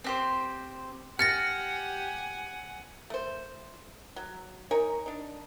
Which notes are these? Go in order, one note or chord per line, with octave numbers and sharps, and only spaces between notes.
C4 G4 C5
G4 F#5 G#5 F6 A6 A#6 C#7
A3 C5
F#3
D#4 A#4 C#5 G#5
D4 D#4